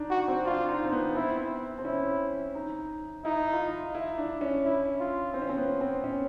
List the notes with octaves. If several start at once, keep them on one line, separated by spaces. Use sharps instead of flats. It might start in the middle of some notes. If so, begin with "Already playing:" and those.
Already playing: D4 D#4
F#4
C4
D4 F4
D#4
C4
B3
C4 E4
C4
C#4 E4
D#4
D#4 E4
F4
E4
E4
D4
C#4
E4
F4
C4
C#4
C4
B3
C4
C#4